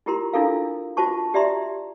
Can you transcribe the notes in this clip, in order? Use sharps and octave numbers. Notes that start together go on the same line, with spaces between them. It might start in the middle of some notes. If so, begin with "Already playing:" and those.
E4 F4 G4 A#4 A#5 C6
D4 E4 F4 A4 A#4 F5
F4 F#4 C5 A5 C#6
G4 D5 E5 A#5 C6